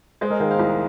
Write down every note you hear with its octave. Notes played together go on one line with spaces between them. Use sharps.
G#3 G#4 C5
A#4 D#5
D#3 C5 F5
C5 F5
C2